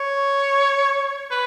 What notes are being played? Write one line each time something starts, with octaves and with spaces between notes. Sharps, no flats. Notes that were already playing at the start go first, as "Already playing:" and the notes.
Already playing: C#5
B4